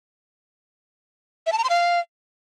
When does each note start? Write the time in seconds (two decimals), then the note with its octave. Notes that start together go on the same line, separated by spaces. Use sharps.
1.46 E5
1.52 A5
1.58 A#5
1.64 C6
1.70 F5